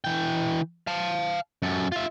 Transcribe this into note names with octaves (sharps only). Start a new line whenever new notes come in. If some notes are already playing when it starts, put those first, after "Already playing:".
E3 G5
F5 A5
F#2 A4
F4 E5